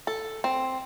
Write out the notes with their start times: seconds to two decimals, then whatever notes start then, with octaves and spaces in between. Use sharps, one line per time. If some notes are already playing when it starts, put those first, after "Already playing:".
0.07 A4
0.44 C4